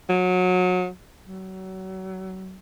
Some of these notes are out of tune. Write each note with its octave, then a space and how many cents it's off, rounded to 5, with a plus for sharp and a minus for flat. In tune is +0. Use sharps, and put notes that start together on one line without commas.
F#3 -25
F#3 +30